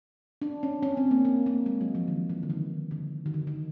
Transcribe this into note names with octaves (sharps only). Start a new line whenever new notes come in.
D4
C#4
C#4
C4
A#3
A#3
A#3
G#3
F#3
F3
D#3
E3
D3
D#3
D3
D#3
D3
D#3